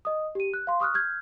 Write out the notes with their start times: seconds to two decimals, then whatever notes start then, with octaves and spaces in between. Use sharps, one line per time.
0.05 D#5 D#6
0.35 G4 D#7
0.54 F#6
0.67 F5 C6
0.80 C#6 D#6 F6 F#6
0.94 F6 G6 G#6